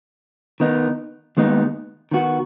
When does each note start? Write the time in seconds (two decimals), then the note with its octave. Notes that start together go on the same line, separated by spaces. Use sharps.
0.60 D#3 B3 D#4
1.37 D#2 D#3 G#3 B3 D#4
2.11 D#3 B3 F#4